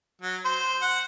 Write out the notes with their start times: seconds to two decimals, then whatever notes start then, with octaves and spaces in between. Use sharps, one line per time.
0.22 F#3
0.45 C5
0.82 F#5